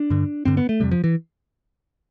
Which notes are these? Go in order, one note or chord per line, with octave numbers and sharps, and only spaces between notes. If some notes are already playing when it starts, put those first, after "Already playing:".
Already playing: D4
G2 D3
G2 D3 C4
B3
A3
F2 C3 G3
F3
E3